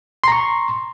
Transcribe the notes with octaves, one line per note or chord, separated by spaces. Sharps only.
A#5 C6 C#6